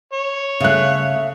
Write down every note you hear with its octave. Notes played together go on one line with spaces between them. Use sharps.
C#5
C#3 A3 E5 F5 F#6